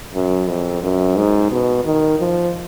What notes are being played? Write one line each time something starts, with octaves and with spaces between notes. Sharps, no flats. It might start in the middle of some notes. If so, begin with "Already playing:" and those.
F#2
F2
F#2
G#2
B2
D#3
F3